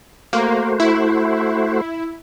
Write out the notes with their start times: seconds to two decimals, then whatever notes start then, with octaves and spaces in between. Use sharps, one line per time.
0.33 A3 A#3 F#4 C5
0.80 E4